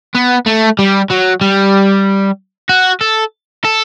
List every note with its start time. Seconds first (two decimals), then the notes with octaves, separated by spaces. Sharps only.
0.15 B3
0.46 A3
0.79 G3
1.10 F#3
1.41 G3
2.69 F#4
3.01 A4
3.65 A4